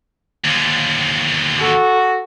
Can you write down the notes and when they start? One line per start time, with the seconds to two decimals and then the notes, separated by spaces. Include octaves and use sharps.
0.44 D#2 D3
1.59 F#4 A4